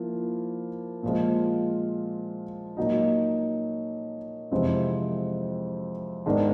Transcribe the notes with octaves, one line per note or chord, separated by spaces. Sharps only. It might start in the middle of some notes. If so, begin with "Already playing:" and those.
Already playing: F3 A#3 E4
A#2 F3 G#3
A#2 F#3 A#3 D#4
F2 C3 E3 G#3 C4
G#2 D#3 G#3 B3 D4